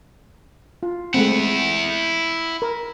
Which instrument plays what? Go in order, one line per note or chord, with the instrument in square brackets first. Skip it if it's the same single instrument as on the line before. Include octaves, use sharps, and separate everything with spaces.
[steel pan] F4
[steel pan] G#3 A3 C4 [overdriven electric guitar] E4 F#5
[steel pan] A#4